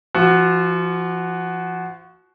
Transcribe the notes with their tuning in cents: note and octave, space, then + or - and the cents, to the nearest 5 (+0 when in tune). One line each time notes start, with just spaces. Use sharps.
F3 -30 F#4 +0